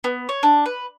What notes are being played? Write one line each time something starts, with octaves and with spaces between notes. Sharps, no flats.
B3
C#5
D4
B4